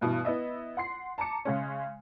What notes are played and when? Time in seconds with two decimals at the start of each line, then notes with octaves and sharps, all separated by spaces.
0.01 G2 B2 E3
0.25 B3 E4 D#5 E5
0.77 F#5 C6 C7
1.18 A5 A#5 D6 C#7
1.45 C#3 G#3 C#4